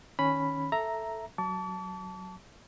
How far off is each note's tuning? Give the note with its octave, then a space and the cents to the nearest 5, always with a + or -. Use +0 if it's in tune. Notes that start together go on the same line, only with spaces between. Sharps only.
D#3 +0 C#4 +0 B5 +0
A4 +0 E5 +0 A#5 +0
F#3 +10 A5 +0 D6 -45